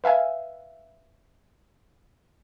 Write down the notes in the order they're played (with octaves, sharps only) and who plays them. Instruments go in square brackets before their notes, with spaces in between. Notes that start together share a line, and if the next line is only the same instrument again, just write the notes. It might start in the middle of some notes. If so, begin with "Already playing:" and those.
[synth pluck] B4 E5 F5 G#5